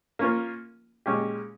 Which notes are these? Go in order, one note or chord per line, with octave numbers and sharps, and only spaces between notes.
A#3 C#4 F4 A#4
A#2 G#3 C#4 G4